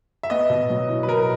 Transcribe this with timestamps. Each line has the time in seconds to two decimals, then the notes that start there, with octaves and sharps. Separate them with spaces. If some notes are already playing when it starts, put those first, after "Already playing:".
0.23 E5
0.30 B3 D#5
0.50 B2
0.70 F#3
0.89 E4
1.03 B4
1.08 B2 A#4